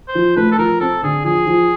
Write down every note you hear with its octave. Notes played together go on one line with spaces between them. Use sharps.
C5
F3
A3 B4
A4
F3 A#4
C4 A4
D3 G#4
F3 G#4
F3